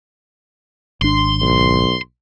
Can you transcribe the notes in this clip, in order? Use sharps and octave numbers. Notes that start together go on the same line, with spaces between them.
G#1 D4 C6
B1